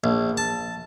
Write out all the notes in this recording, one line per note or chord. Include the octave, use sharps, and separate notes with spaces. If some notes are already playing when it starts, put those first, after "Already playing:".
A#1
A5